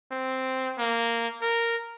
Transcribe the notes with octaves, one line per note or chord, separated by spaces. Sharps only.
C4
A#3
A#4